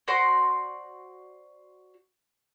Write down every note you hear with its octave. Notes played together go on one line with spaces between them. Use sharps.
F#4 C5 D5 C6